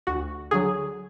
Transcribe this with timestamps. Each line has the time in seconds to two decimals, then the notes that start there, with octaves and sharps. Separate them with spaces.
0.07 D2 F#4
0.51 D3 F#3 G#4